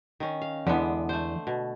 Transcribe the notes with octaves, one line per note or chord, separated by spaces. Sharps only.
D#3 C#4
F5
E2 D3 E3 G#3 B3
A3 C5
B2